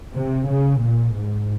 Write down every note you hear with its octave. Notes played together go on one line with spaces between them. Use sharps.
C3
C#3
A#2
G#2